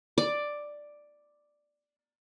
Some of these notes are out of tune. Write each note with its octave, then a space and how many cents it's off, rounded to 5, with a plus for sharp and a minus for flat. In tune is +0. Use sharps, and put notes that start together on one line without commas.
D5 +5